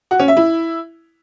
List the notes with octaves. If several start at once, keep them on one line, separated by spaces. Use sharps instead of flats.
F#4
C#4
E5
E4